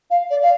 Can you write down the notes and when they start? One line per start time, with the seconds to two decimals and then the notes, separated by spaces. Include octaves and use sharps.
0.10 F5
0.30 D5
0.42 F5